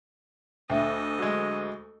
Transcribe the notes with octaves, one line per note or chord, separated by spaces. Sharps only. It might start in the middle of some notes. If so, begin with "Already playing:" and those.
D2 A3 A4 D#5 E5 G5
F#3 G#3